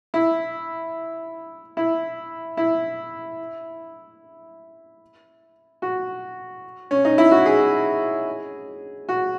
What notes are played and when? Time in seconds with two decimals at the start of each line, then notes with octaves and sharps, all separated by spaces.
0.14 E4
1.77 E4
2.57 E4
5.82 F#4
6.91 C#4
7.05 D#4
7.18 E4
7.31 F#4
7.46 G#4
9.09 F#4